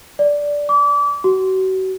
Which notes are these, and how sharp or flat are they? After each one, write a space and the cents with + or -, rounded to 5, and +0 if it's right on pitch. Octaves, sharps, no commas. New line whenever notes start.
D5 -5
D6 -30
F#4 +35